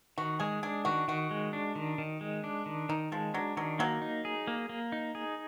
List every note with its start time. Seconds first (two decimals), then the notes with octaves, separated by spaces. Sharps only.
0.18 D#3 F#4
0.40 G#3 G#4
0.63 D4 G#4
0.85 D#3 F#4
1.08 D#3 F#4
1.31 G#3
1.53 D4
1.76 D#3
1.98 D#3
2.21 G#3
2.44 D4
2.66 D#3
2.89 D#3 D#4
3.12 F3 G#3
3.34 F#3 D4
3.57 D#3 F#3
3.79 F#3 A#3
4.02 D#4
4.25 G#4
4.47 A#3
4.69 A#3
4.92 D#4
5.15 G#4